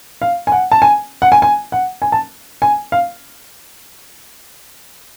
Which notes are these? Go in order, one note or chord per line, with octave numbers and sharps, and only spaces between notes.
F5
G#5
F#5
A5
G#5
F#5
G#5
G#5
F#5
G#5
A5
G#5
F5